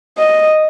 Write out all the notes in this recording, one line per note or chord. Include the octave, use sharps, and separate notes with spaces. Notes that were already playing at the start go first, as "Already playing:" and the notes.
D#5